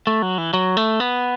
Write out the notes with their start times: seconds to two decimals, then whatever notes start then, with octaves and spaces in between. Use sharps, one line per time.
0.07 A3
0.22 F#3
0.38 E3
0.54 F#3
0.77 A3
1.00 B3